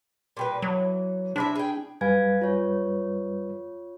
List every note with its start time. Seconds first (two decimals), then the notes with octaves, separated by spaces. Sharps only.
0.37 A#2 G3 B4
0.62 E3 F#3
1.36 C3 D4 E4 E5
1.55 G#4 G5
2.01 F#2 G3 B4 F5 G#5 G#6
2.41 F4 C#5